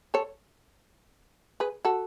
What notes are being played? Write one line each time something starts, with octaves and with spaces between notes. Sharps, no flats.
A4 C#5
G#4 B4
F#4 A4